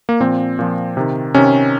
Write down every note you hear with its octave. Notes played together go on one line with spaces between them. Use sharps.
A#3
A#2 F3 C4
A#2 F3
C3 D#3
C3 D#3 C#4